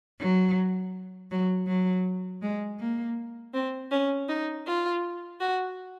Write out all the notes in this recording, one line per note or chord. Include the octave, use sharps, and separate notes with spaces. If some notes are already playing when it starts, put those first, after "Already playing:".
F#3
F#3
F#3
G#3
A#3
C4
C#4
D#4
F4
F#4